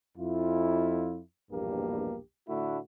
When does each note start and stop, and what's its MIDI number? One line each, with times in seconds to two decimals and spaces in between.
0.18 1.20 41
0.18 1.20 64
0.18 1.20 65
1.51 2.20 34
1.51 2.20 40
1.51 2.20 43
1.51 2.20 47
1.51 2.20 58
1.51 2.20 67
2.48 2.79 45
2.48 2.79 50
2.48 2.79 57
2.48 2.79 62
2.48 2.79 64
2.48 2.79 66